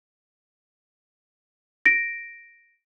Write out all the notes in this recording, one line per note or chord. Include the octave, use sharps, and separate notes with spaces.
A#6 D7